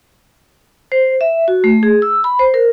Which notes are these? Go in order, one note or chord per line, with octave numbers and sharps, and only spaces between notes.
C5
E5
F#4
A3
G#4
E6
B5
C5
A#4